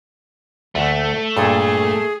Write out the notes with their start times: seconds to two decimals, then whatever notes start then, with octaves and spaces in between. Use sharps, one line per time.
0.75 D2 A3 E5 F#5
1.37 G2 A#2 G#4 A4